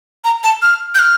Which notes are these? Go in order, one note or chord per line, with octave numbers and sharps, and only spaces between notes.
A#5
A5
F6
G6
F6